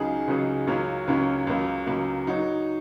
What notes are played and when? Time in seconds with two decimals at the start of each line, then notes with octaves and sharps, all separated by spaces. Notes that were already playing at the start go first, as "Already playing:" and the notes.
Already playing: C#2 C#3 F#3 D#4 G#4
0.27 C#2 C#3 F#3 D#4 G#4
0.67 C#2 C#3 F#3 A#3 C#4
1.07 C#2 C#3 F#3 A#3 C#4
1.47 C#2 C#3 F#3 A#3
1.87 C#2 C#3 F#3 A#3
2.27 F#3 D#4 F#4 C#5